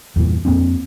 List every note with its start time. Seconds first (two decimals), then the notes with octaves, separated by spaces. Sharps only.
0.16 E2 G2 A#2 E3
0.45 F2 A#3 C4 D4